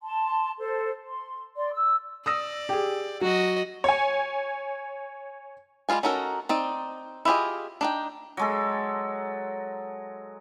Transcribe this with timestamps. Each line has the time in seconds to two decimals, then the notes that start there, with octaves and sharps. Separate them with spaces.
0.01 A5 C6
0.58 A4 C5
1.05 C6
1.56 D5 C6
1.73 E6
2.26 D5 D#6 E6 A#6
2.69 G4 G#4
3.21 F#3 F#4 D#5
3.84 C#5 G#5
5.89 G3 G#3 E4 F4 G#5
6.03 C#4 D#4 F#4 A4 A#4
6.49 C4 D#4 D5
7.25 E4 F4 G4 G#4 D#5
7.81 D4 D#4 G5
8.37 F#3 G#3 A4